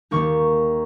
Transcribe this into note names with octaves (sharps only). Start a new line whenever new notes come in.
D#2 D#3 A#3 D#4 C#6